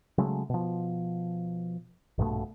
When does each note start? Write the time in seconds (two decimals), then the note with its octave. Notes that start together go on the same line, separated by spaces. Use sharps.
0.18 C#3 F#3 G#3 A3
0.50 B2 F3
2.18 A#1 G2 B2 A3